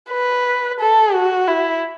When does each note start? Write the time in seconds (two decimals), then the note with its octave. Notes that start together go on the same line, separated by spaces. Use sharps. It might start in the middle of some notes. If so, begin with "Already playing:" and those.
0.10 B4
0.80 A4
1.13 F#4
1.47 E4